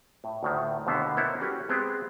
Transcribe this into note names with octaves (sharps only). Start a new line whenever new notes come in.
A2
D2 A2 D#3
D#2 B2 D3 B3 C5
A#3 B3 E4 A#4 C5 C#5
C#4 F#4 G4 A4 B4 C#5
G#3 B3 C4 G4 G#4 C5